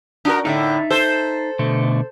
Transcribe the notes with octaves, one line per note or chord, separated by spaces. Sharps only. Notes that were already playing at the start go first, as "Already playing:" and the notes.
D4 F#4 A#4
A2 D3 D#4 E5
A4 C5
B2 D3 A3